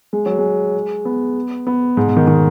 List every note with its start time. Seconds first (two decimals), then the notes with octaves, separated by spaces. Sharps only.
0.13 G#3
0.26 F#3
0.39 G#3
1.05 B3
1.67 B3
1.97 G#2
2.07 B2
2.17 D#3
2.27 D#3